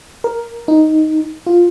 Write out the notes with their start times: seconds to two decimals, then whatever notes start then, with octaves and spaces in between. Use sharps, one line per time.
0.24 A#4
0.68 D#4
1.46 F4